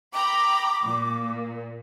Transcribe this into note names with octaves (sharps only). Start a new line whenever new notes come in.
G5 A#5 B5 D6
A#2